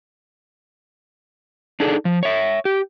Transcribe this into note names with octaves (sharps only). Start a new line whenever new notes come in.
D4 D#4 G#4 A4
F3
C#5 E5
G4